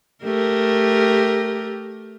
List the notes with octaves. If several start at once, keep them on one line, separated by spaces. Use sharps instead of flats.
A3 G4 A#4